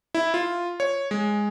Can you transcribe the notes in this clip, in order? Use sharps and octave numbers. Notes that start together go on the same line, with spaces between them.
E4
F4
C#5
G#3